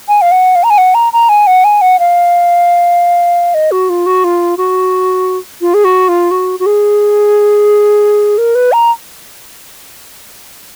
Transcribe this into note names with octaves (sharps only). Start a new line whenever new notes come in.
G#5
F5
F#5
F5
A#5
G#5
F#5
A#5
A#5
G#5
F#5
G#5
F#5
F5
D#5
F#4
F4
F#4
F4
F#4
F4
G#4
F#4
F4
F#4
F#4
G#4
A#4
B4
A#5